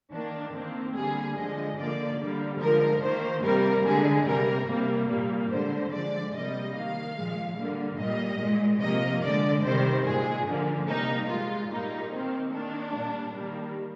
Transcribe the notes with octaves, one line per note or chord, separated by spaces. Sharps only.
D#3 A#3 D4
D#3 A#3 C4
D3 G3 A#3 G#4
D3 F3 G#3 D#5
D3 F3 A#3 D5
D3 G3 A#3
D3 F3 G#3 A#4
D#3 A#3 C5
C3 G3 A#3 A#4
D3 G#3 G#4
C3 G3 A#3 A#4
C3 G3 A#3
A#2 G3 A#3
D3 G#3 C5
D3 F3 G#3 D5
C3 G3 A#3 D#5
D#3 A#3 F5
A#2 F3 G#3
D3 G3 A#3
A#2 G3 A#3 D#5
A#2 G#3
C3 F3 A#3 D#5
D3 G#3 D5
C3 D#3 G3 C5
A#2 G#3 G#4
D3 F3 A#3
C3 G3 A#3 D#4
A#2 G#3 F4
A#2 G3 A#3 D#4
D#3 A#3 C4
D#3 A#3 D4
A#2 G3 A#3
D#3 G3 A#3